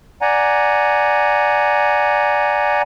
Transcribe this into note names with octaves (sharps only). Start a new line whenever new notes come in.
D5 F#5 G#5 A#5